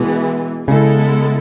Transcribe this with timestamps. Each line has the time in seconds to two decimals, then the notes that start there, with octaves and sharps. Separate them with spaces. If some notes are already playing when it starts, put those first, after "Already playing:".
Already playing: B2 E3 G#3 B3
0.68 C#3 G#3 B3 E4 A4